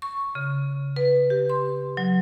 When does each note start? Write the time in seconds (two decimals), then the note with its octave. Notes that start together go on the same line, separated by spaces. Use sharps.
0.02 C#6
0.35 C#3
0.96 B4
1.30 G4
1.49 C6
1.97 F#3